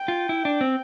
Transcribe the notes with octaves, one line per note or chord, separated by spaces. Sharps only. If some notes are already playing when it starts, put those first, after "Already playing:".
Already playing: G5
F4
E4
D4
C4